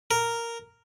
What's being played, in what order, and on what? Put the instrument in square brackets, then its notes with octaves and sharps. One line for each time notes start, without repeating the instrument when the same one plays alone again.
[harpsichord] A#4